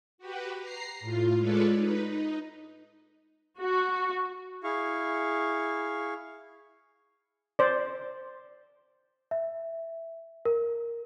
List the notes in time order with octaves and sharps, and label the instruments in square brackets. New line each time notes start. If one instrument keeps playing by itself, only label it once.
[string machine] F#4 G4 B4
A#5 C7
A2 F4
G#3 F4 A4 B4 C#5 D5
D#4 B4
D#4
[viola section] F#4
[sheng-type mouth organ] E4 G#4 F5 C#6
[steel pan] C5 D5
[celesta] E5
A#4